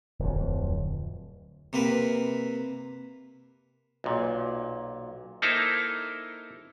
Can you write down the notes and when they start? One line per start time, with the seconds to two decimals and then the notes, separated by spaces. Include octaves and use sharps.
0.19 D1 F2
1.73 C3 A#3 B4
4.04 B1 A#2
5.42 A#3 D#4 E4 A4 C5 A#5